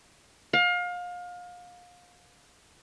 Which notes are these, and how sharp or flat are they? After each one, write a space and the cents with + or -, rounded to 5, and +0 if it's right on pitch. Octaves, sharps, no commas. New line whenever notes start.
F5 +30